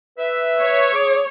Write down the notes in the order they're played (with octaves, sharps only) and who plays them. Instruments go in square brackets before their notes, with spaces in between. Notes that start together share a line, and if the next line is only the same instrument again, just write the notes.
[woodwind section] B4 E5
[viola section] C#5
[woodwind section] G#4 D6